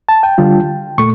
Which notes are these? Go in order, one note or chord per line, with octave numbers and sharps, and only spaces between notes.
A5
G5
D3 G3 D4 F4
A#2 A3 C#6